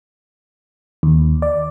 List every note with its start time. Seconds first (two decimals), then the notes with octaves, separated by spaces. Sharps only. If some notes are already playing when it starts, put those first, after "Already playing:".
1.03 D#2
1.42 D5